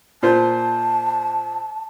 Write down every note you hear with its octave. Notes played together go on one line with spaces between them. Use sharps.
A#2 F4 C5 A5